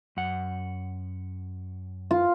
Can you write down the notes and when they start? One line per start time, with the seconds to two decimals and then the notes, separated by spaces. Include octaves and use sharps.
0.17 F#2 F#5
2.11 F4